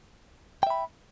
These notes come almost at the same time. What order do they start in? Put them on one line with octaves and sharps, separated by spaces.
G5 E5 B5